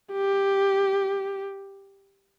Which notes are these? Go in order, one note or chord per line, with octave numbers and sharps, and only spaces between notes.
G4